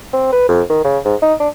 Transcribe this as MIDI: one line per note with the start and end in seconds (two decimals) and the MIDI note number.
0.13 0.30 60
0.32 0.47 71
0.48 0.62 41
0.69 0.84 51
0.84 0.98 49
1.05 1.15 44
1.22 1.34 63
1.40 1.48 62